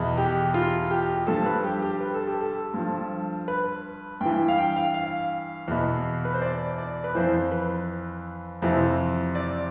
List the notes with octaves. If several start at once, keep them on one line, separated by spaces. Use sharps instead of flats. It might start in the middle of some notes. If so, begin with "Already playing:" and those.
Already playing: E2 B2
G4
F4
G4
G2 F3 A4
B4
G4
G4
B4
A4
G4
A4
G2 F3
B4
G2 E3 G5
F5
G5
F5
F5
E2 B2
B4
C5
D5
D5
B4
F2 E3 C5
B4
F2 C3 E3
D5